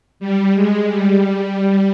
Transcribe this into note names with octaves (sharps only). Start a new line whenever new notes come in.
G3
G#3
G3